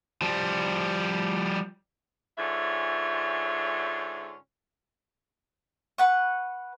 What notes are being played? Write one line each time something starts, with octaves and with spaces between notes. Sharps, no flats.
F3 G3
G#2 D3 C#4 F4 E5
B4 F#5 C#6